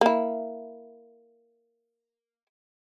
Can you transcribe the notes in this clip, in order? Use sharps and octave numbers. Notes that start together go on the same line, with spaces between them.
A#3 E4